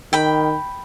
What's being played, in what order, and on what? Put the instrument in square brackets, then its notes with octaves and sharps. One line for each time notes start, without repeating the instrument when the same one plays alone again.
[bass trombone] D#3 [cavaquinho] G5 B5